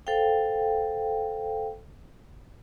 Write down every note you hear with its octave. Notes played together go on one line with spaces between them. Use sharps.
A4 C5 F5 G5